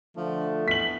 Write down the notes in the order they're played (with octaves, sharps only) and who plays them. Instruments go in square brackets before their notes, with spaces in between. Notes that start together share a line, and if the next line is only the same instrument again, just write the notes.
[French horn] D3 [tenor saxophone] F3 [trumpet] A3
[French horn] E3 [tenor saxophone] B3 [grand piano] B6 F#7